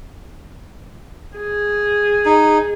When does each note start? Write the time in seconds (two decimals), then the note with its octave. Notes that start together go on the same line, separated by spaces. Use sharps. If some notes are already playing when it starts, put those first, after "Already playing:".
1.38 G#4
2.26 D#4